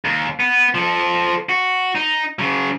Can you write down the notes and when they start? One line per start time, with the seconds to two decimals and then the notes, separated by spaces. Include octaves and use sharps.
0.05 D#2
0.40 B3
0.75 F3 A4
1.49 F#4
1.95 D#4
2.39 C#3 F#3